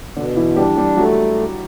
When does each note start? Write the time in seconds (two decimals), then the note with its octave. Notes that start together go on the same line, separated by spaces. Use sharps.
0.16 B2 D3 D4
0.36 E3 E4
0.56 G3 D4 G4
0.77 G3 G4
0.97 F#3 A3 F#4